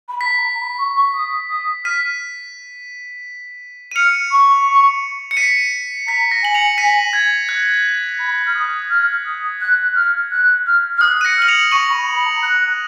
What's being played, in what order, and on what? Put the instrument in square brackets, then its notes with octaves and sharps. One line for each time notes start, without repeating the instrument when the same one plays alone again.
[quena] B5
[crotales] B6
[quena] A#5
A#5
B5
C#6
C#6
D#6
D#6
[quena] F6 [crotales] B6 D#7
[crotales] D#7
[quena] F6 [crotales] C#7 F7
[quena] C#6
[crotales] C#7
B6 D#7
[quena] A#5 [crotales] B6
[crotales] A#6
[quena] G#5 [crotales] F#7
[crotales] C#7 F7
B6 D#7
G#6
F#6
[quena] B5
F6
D#6
F6
D#6
F#6
F6
F#6
F6
F6
[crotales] D#6 [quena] F#6
[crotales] D#7
A#6 C#7
[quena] F6 [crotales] F#7
[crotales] C#7 F7
[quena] C#6 [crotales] D#7 F#7
[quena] B5
B5
A#5
F#6
F#6